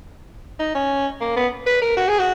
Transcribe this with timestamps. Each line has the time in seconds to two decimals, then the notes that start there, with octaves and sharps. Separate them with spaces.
0.59 D#4
0.75 C#4
1.21 A#3
1.36 B3
1.66 B4
1.82 A#4
1.97 F#4
2.08 G#4
2.19 F#4